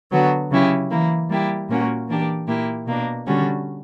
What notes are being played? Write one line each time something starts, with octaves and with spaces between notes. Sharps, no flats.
D3 F#3 B3 F#4
C#3 F#3 C#4 E4 G4
E3 A#3 E4
G3 A#3 E4 G4
A#2 A#3 C#4 F#4
E3 A#3 D4 G4
A#2 A#3 E4 G4
B2 A#3 D4
D3 G3 C#4 F#4